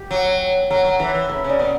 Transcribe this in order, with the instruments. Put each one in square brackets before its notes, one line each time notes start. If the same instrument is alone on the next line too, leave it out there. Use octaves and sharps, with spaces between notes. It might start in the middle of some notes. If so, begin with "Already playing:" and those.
Already playing: [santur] G4
[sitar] F#3
[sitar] F#3 [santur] A#4
[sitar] F#3
[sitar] E3 [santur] A#4
[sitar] E3
[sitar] C#3 [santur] B4
[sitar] C#3
[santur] D5
[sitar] B2